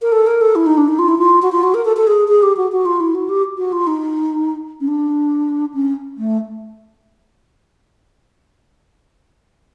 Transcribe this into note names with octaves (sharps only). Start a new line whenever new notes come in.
A#4
A4
A#4
A4
E4
D#4
D4
D#4
F4
E4
F4
F#4
F4
F#4
A#4
A4
A4
G#4
G#4
G4
F#4
F#4
F4
E4
F#4
G4
F#4
F4
D#4
C#4
D4
C#4
A3